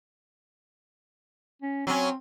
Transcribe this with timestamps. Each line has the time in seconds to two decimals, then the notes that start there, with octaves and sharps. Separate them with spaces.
1.62 C#4
1.87 F#3 C4 C#4